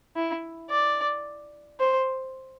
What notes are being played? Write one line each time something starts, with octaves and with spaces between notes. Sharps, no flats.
E4
D5
C5